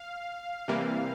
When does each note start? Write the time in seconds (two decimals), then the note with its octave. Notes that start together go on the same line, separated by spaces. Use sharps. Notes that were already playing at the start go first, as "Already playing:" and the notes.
Already playing: F5
0.68 C3 E3 G3 A#3